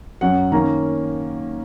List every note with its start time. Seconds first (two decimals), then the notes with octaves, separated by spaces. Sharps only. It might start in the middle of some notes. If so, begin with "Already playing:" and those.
0.21 F#2 F#3 C#4 F#5
0.52 D#3 A#3 C#4 A#5